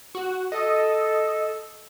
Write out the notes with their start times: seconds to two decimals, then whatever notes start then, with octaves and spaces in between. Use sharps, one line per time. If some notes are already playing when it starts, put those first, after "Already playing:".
0.15 F#4
0.52 A4 D#5